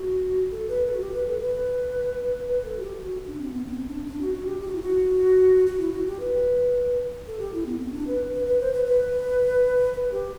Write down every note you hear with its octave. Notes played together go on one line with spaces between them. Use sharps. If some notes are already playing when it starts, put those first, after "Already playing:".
Already playing: F#4
A4
B4
A4
F#4
G4
B4
A4
B4
B4
A4
F#4
G4
F#4
D4
C4
B3
B3
C4
D4
D4
F#4
F#4
G4
G4
F#4
E4
F#4
F#4
E4
F#4
G4
B4
A4
G4
E4
B3
C4
D4
B4
B4
B4
C5
B4
B4
B4
G4